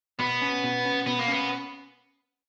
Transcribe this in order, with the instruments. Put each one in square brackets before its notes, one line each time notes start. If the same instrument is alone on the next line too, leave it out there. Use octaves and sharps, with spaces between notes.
[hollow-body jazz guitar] B2 [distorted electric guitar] B3
[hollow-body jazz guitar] C#4
B2
C#4
[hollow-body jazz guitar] B2 [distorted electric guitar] B3
[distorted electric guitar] A#3
[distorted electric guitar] B3 [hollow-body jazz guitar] C#4